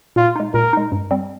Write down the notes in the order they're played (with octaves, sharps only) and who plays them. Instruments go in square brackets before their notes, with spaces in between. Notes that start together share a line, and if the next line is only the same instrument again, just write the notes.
[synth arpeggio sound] A#2 [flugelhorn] F4
[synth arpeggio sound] G#3 D#4
[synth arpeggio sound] A#2 [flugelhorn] A#4
[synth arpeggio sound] G#3 D#4
G2
G3 C4